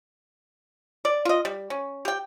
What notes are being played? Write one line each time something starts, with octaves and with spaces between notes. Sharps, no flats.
D5
F4 D#5
G3
C#4
G4 G5